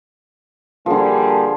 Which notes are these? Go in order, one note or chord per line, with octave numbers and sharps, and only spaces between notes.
D3 F3 G3 A#3 G#4